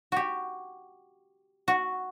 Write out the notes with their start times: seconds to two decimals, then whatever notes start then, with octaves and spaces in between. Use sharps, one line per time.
0.12 F#4 G4
1.68 F#4